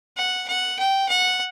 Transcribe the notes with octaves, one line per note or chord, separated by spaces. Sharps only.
F#5
F#5
G5
F#5